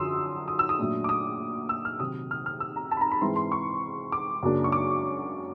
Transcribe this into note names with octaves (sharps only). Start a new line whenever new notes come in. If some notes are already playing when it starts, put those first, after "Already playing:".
Already playing: F#2 D3 F3 C6 D#6 E6
D#6
E6
D#6
A#2 F#3 A3 D4
D6
D#6
E6
F6
C3 D#3 F#3 D#6
F6
F6
E6
A#5
A5
B5
A#5
B5
G#2 E3 G#3 C4 C6
C6
C#6
D6
F#2 C#3 F#3 A#3 D4
C#6
D6